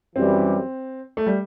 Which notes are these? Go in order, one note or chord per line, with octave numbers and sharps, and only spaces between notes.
F#2 E3 G3 C4
A3
G3